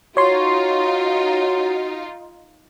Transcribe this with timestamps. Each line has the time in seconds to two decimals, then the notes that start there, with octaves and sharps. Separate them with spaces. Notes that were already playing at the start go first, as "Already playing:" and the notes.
0.17 D#4 F4 F#4 C#5 C6